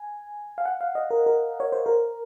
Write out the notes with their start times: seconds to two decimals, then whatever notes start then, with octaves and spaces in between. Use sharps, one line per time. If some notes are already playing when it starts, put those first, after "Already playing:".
Already playing: G#5
0.58 F5
0.66 F#5
0.81 F5
0.95 D#5
1.11 A#4
1.26 A#4
1.60 C#5
1.72 C5
1.86 A#4